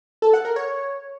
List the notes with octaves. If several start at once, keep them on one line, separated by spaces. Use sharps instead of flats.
A4
F#5
A#4
C#5